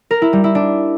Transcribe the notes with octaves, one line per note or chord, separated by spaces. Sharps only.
A#4
E4
G3
E4
D4